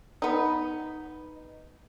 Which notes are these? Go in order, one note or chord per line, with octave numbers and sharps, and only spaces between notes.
B3 D#4